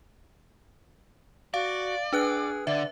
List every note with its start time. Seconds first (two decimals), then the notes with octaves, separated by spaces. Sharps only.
1.54 F#4 D5 F5
2.13 D4 G#4 B4 F#6
2.67 D3 D5 E5